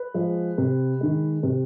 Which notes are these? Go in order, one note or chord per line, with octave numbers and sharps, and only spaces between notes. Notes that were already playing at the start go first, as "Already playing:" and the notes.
Already playing: B4
F3 G#3
C3
D#3 G#3
C3